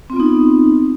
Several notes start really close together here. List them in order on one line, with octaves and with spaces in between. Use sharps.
C4 F4 B3 D#4